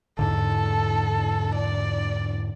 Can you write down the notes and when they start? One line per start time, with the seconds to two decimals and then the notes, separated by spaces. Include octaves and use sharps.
0.19 E2 G#2 D3 A4
1.55 D5